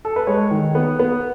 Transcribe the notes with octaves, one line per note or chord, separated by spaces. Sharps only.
A4
B4
G#3 C#5
D#3
B3
B3